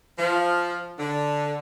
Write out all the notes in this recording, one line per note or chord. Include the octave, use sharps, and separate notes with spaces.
F3
D3